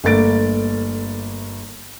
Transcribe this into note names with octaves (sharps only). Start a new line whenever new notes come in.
G1 A3 A#3 A6 D7